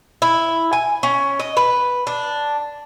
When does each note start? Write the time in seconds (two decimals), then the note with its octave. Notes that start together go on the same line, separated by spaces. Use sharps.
0.22 E4
0.73 G#5
1.03 C#4
1.40 D#5
1.57 B4
2.07 D4